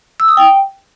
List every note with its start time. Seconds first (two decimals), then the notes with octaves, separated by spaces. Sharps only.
0.20 E6
0.28 D#6
0.37 G5